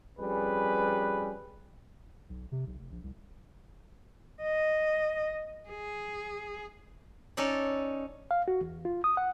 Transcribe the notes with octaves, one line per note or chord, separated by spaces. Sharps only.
F2 G3 C#4 G#4 B4
B1
C3
B1
F1
A#1
C2
D#5
G#4
C#4 D#4 A4 D5
F5
F#4
E2
F4
D#6
F#5